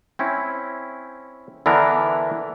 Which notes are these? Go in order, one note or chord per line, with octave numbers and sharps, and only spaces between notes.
C4 C#4 E4
D3 E3 B3 D4 A#4